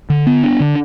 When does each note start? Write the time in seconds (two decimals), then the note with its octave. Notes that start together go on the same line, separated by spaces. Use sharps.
0.10 D3
0.27 B3
0.44 D4
0.60 D3